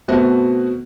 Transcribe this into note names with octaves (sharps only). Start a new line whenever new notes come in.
B2 A3 B3 C4 F#4